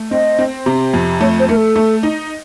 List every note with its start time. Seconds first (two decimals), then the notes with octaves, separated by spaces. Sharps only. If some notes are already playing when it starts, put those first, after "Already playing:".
Already playing: A3
0.11 C4 D#5
0.39 C4
0.66 C3
0.94 F2
1.20 A3 C#5
1.39 C5
1.49 A3 A#4
1.57 A4
1.76 A3
2.03 D#4